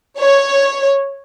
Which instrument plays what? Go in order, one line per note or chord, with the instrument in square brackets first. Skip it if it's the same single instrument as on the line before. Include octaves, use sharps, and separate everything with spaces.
[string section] C#5